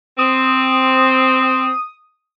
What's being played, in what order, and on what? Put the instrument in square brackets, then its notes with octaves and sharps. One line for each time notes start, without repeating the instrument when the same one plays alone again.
[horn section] C4 [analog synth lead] D#6